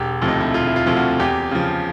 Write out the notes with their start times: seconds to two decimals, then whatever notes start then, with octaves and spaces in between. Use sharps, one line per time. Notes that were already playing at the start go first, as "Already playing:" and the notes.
Already playing: E1 G4
0.22 D2 C3 F3
0.28 D#4
0.41 E4
0.54 E1 F4
0.67 E4
0.76 F4
0.86 D2 C3 F3
0.97 F#4
1.20 E2 G4
1.51 C#3 F3